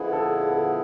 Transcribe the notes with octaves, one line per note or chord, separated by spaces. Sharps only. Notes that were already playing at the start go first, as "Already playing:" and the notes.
Already playing: F2 D3 F3 B3 E4 G#4
A4
A4